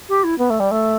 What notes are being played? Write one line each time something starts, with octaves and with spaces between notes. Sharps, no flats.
G4
E4
B3
A3
G3
A3